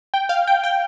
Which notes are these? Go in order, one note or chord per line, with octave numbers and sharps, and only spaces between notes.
G5
F5
G5
G5